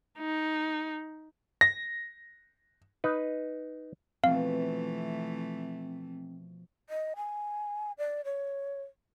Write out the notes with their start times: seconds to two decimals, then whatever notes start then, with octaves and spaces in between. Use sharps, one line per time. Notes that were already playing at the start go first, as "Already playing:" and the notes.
0.19 D#4
1.61 A#6
3.04 D#4 B4
4.24 B2 E3 F3 A3 C4 F5
6.90 D#5
7.16 G#5
7.98 D5
8.25 C#5